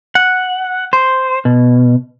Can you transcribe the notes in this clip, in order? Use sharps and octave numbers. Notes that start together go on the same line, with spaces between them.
F#5
C5
B2